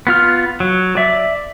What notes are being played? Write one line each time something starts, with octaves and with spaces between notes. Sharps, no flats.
B3 F4 F6
F#3
D5 E5